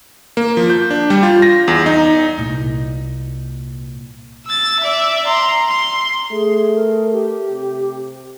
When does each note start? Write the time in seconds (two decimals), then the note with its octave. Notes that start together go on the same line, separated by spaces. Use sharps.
0.37 A#3
0.57 F3
0.70 G6
0.90 D4
1.10 G3
1.23 F4
1.42 A#6
1.68 E2
1.86 D#4
2.38 C2 A#2
4.46 E6 A6
4.79 D5 E5
5.27 A#5 C6
5.68 C6
6.31 A3 G#4
6.75 A#4
7.12 G4
7.50 C3